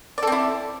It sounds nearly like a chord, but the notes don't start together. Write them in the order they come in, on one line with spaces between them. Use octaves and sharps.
D5 A4 C4 E4